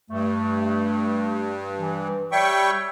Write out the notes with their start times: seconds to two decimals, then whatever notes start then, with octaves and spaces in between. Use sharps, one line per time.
0.11 G2 A3
1.79 E3
2.32 G3 C#5 E5 G5 C#6